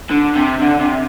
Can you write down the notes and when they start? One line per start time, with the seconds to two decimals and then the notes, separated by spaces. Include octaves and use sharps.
0.10 D3
0.35 C3
0.62 D3
0.80 C3